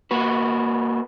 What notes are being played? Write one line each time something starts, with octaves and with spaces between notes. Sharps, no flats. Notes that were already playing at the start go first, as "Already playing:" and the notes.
A#3 F#4 B4